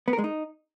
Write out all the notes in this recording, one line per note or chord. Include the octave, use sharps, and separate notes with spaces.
B3
A#4
G#3
D#4